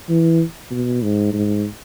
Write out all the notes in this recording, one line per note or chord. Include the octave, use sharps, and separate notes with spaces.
E3
B2
G#2
G#2